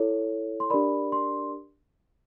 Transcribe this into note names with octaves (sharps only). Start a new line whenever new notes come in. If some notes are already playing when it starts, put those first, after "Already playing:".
Already playing: E4 A4 C#5
C6
D4 G4 A#4 D5 B5
C6